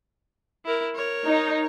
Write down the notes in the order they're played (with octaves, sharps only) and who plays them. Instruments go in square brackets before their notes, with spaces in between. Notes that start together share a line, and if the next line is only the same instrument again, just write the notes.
[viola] E4 A#4
A#4 C#5
[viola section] D#4